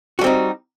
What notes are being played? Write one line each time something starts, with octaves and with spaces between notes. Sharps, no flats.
G3 C4 D#4 F#4